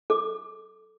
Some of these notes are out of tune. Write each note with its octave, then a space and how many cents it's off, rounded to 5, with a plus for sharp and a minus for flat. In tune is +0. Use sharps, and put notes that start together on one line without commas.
A4 -10 D6 +0